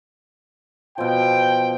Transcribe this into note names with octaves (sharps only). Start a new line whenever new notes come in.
B2 F3 G5